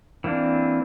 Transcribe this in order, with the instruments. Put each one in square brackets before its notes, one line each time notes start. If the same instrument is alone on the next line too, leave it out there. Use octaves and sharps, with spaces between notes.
[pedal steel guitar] E3 A#3 C4 D4